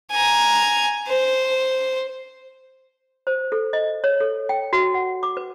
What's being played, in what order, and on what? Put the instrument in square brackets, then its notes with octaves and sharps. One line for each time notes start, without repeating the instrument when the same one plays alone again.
[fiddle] G#5 A#5
C5
[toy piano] C5
A4
D#5
C#5
A4
G5
F#4
F#5
D6
B4